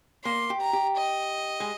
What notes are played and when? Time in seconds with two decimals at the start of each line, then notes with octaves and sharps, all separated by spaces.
0.25 A#3 C6
0.50 G4
0.62 A#5
0.73 G4
0.98 D#5
1.60 G#3